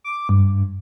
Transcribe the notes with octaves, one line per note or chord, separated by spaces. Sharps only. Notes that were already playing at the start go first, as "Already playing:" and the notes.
D6
G2